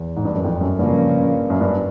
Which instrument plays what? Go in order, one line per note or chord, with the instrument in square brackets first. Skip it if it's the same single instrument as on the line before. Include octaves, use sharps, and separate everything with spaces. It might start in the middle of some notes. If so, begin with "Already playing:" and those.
Already playing: [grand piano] E2
G#2
G2
F#2
F2
F#2
[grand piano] G2 [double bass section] C#3 F3 A#3 C#4
[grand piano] F#2
G2